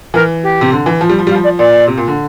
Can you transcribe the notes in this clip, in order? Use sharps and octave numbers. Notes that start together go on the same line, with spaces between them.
E3 A#4
G4
C3
D3
E3
F3
G3
F3
G3 F4
F3
D5
A#2 D5
C3
A#2
D3